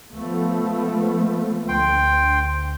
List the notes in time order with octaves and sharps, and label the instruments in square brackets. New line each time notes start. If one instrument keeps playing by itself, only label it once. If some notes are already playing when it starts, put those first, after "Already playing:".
[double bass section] F3 A3 B3
[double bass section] D2 [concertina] G5 C6